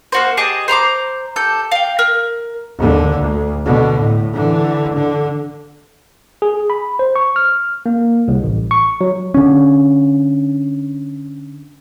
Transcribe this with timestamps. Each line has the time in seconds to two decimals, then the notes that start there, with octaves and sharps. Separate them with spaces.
0.12 A#3 F#4 C5
0.37 G4 G#4 D#5 A5
0.68 C5 A#5 C6 D6
1.36 G4 A4 G6
1.72 F5 G5
1.99 A#4
2.77 D#2 D3
3.18 D2
3.65 B2 D3
3.99 A2
4.33 D3 E3
4.96 D3
6.42 G#4
6.70 B5
6.99 C5
7.16 C#6
7.36 F6
7.86 A#3
8.28 C2
8.43 A1
8.71 C#6
9.01 F#3
9.34 D3 C#4